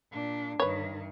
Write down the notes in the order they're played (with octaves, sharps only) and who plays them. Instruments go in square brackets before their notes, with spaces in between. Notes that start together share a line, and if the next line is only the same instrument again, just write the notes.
[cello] A#2 D4
[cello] G2 D#3 [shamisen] B4 C#5